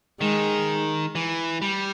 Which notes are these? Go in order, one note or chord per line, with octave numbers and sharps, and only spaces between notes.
D#3 G#3
E3
G3